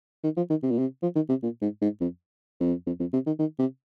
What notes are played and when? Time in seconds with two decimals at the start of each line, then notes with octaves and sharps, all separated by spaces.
0.24 D#3
0.37 F3
0.50 D#3
0.63 C3
0.71 A#2
0.78 C3
1.02 F3
1.15 D#3
1.29 C3
1.43 A#2
1.62 G#2
1.82 G#2
2.01 F2
2.60 F2
2.86 F2
3.00 F2
3.13 C3
3.27 D#3
3.39 D#3
3.59 C3